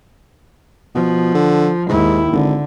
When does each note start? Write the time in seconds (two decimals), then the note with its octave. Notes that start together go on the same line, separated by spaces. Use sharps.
0.95 B2 F3
1.34 D3
1.89 D#2 G#2 E4
2.32 G#1 D3